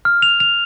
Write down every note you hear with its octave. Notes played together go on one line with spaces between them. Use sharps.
F6
F7
F7